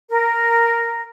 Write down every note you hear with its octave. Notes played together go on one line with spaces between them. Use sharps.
A#4